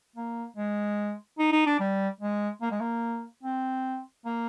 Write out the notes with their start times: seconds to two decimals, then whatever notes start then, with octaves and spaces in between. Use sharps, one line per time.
0.16 A#3
0.56 G#3
1.38 D#4
1.52 D#4
1.66 D4
1.80 G3
2.20 G#3
2.61 A#3
2.71 G#3
2.81 A#3
3.43 C4
4.25 A#3